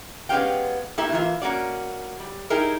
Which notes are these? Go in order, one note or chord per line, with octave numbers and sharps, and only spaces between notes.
G#3 B3 C#4 G4 F5 G5
A3 A#3 E4 G4 E5
E3 A#3 F4 E5
A#3 C#4 F#4 D5
G3
D#4 E4 G4 G#4 A#4